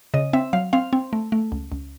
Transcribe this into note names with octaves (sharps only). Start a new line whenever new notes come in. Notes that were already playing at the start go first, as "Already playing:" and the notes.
C#3 D#5
C4 E5
F#3 F5
C4 F5
C4
A3
A3
C#2
C#2